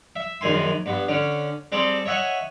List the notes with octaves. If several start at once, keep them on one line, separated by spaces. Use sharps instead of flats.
E5
A#1 F#2 D#3 G#5 C6
G2 B3
D3 C#4
G3 C4 G#4 A4
C#5 D#5 E5 F#5 G#5